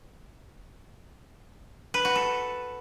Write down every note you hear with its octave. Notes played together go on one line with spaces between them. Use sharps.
B4
F#4
A4